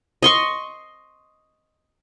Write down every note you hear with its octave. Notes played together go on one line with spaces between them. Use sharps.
D#5 C6 C#6